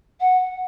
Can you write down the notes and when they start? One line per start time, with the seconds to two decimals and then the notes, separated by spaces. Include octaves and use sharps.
0.20 F#5